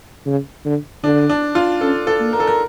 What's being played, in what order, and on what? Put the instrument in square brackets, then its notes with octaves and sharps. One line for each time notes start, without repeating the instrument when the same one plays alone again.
[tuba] C#3
D3
[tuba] D3 [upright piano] D4
[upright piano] D4
F4
[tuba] C#4 [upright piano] A4
[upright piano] A4
[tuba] A#3
[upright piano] A#4
A4
A#4